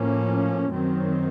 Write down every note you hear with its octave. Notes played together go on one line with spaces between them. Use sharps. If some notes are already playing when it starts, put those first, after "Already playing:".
Already playing: A2 F3 A#3 C#4
F#2 D#3 F#3 C4